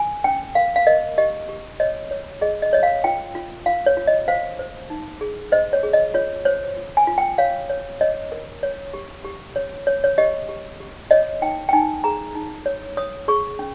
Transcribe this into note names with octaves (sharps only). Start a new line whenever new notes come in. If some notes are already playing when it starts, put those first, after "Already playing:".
Already playing: G#5
C#4 G5
A#4 F5
F5
A#4 D#5
G4 D#5
G4
C#5 D#5
C#5
G#4 D#5
D#5
C#5 D#5
F5
F4 G5
F4
F4 F5
C#5
F4
D#5
C5 F5
C5
D#4
G#4
C5 D#5
C#5
G#4
D#5
F4 C#5
C5 C#5
F4
G#5
F4
G5
C#5 F5
C#5
C#5 D#5
A#4
C#5
G4
G4
C#5
C#5
C#5
G4 D#5
G4
G4
C#5 D#5
D#4 G5
G5
D#4 G#5
G#4 A#5
D#4
C#5
C#5 D#6
G#4 C#6
C#4